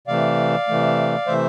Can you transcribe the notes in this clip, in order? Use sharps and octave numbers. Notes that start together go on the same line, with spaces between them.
C3 E3 A3 D5 F5
C3 E3 A3
C3 E3 A3 C5 E5